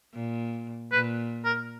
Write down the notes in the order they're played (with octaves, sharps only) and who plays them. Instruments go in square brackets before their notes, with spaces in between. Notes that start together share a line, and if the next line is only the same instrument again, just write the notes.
[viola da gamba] A#2
[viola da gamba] A#2 [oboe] B4
[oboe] A#4